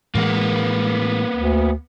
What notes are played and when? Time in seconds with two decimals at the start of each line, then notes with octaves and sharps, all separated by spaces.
0.15 A2 E3 G#3 A#3 B3
1.35 D2